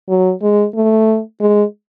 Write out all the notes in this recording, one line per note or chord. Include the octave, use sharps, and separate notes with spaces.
F#3
G#3
A3
G#3